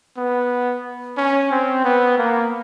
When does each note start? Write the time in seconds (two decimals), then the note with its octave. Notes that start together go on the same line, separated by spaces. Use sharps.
0.17 B3
1.18 C#4
1.51 C4
1.84 B3
2.18 A#3